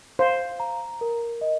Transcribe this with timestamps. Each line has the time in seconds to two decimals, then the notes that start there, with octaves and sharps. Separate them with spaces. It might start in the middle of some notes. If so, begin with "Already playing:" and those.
0.19 C5 F5
0.60 A#5
1.01 A#4
1.41 D#5